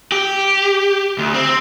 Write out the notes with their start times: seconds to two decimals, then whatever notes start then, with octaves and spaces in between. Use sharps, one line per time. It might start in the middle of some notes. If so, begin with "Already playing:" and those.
0.12 G4
1.18 D2
1.34 C4